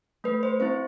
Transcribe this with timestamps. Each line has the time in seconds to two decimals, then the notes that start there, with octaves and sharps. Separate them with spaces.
0.24 A3 B4
0.43 C5
0.60 C4 E4 C5